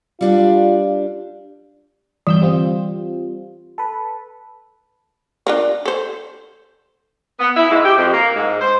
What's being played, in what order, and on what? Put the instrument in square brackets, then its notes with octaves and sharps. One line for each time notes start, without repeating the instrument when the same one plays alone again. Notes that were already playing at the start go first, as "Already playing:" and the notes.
[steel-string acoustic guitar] G3 D4 G4 [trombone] F4
[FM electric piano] G1 E6 G6 [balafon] E3
[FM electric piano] G3 C4 F4
A4 B4
[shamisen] D4 F4 A#4
A4 C5
[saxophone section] B3
E4
G#2
G4
F2
A#3
G#2
C5